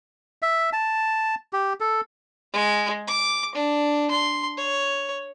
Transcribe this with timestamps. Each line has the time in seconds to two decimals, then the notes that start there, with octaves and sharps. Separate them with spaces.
0.42 E5
0.73 A5
1.53 G4
1.80 A4
2.53 G#3
3.08 D6
3.55 D4
4.11 C6
4.57 C#5